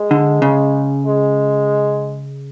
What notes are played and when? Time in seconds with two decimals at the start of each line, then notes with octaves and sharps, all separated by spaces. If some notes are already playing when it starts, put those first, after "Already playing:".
Already playing: G#3
0.11 D3
0.42 C#3
1.06 G#3